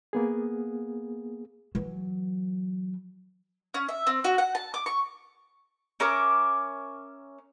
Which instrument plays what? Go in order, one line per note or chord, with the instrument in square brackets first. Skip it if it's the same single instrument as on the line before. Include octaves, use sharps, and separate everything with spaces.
[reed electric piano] A#3 B3 G#4
[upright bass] E3 F#3
[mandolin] C#4
E5
C4
F#4
F#5
A5
D6
C#6
C#4 A#4 E5 D6